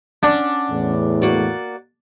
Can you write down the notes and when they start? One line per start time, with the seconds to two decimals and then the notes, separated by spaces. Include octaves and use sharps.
0.23 C#4 D4 F#5
0.71 E2 A2
1.22 A#3 F#4 D5